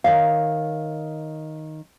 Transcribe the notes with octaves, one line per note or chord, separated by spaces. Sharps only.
D#3 C#5 F5